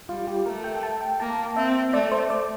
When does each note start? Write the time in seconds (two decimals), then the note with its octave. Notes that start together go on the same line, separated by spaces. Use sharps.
0.09 G3 F4
0.27 G4
0.45 A3 A#4
0.64 G5
0.83 A5
1.01 G5
1.20 A#3 A5
1.56 C4 E5
1.93 A3 D5
2.12 C5
2.30 D5